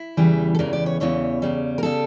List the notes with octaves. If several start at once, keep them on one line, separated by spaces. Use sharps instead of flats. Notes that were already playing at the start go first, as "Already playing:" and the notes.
Already playing: E4
E2 C#3 E3 G3
A4
E2 C#3 E3 G3 A#4
D5
C#5
E2 C#3 E3 G3 C#5
E2 C#3 G3
A#4
C#3 G3 A4